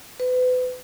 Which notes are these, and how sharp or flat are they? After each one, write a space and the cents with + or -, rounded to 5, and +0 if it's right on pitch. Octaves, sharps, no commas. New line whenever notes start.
B4 +35